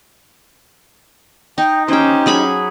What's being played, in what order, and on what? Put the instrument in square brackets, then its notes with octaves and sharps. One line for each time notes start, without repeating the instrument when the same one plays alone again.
[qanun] D#4 [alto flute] G5
[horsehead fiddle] C#4 G4 [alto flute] D#4 [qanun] C5 G5
[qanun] F#3 G#4 B5